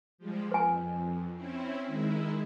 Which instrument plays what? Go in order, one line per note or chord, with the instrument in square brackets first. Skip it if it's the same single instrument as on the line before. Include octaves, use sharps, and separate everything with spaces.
[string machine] F3 G3 G#3
[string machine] F2 [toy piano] B4 G#5
[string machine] C4 C#4 E4
D#3 G#3 E4